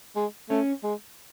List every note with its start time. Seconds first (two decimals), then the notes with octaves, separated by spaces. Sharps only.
0.16 G#3
0.50 A3 C#4
0.83 G#3